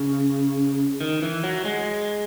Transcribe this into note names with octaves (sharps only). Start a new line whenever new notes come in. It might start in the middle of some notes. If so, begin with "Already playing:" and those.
Already playing: C#3
D#3
E3
F#3
G#3